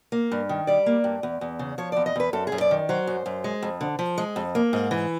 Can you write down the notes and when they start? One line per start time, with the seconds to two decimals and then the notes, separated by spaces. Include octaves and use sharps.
0.12 A#3
0.32 G2
0.49 D#3
0.67 G3 D5
0.86 A#3
1.04 G2
1.23 E2
1.41 E2
1.59 C#3
1.78 F3 C#5
1.92 E2 D5
2.06 D#5
2.16 E2 B4
2.33 F#2 A4
2.47 G#4
2.52 F#2
2.61 D5
2.71 D#3
2.89 F#3 C5
3.07 F#2
3.26 F#2
3.44 G#3
3.63 F2
3.81 D3
3.99 F3
4.18 G#3
4.36 F2
4.55 A#3
4.73 G#2
4.91 E3